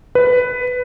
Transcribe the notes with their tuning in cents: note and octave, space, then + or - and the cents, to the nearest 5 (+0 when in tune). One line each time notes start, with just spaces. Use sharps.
B4 +10